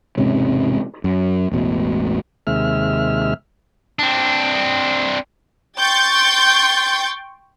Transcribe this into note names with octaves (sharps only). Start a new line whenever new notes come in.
E1 G#2 C3 C#4
F#2
E1 A1 B2
D#2 C3 G#3 E5 F6
C4 D4
G5 C6 C#6 G6 A6